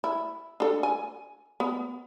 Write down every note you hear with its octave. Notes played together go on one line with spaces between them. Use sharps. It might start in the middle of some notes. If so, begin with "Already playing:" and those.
E4
D4 A4
G#5
B3